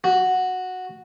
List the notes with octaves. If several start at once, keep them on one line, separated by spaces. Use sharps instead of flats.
F#4